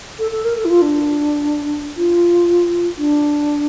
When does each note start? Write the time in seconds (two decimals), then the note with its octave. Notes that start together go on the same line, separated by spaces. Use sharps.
0.19 A4
0.31 A4
0.44 A#4
0.57 A4
0.65 E4
0.70 F4
0.81 D4
1.96 F4
2.98 D4